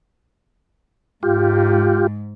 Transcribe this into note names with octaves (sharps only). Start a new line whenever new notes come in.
G#2 F4 G4